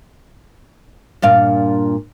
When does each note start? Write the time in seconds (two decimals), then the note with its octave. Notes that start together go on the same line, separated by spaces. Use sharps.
1.22 G2 A#2 F5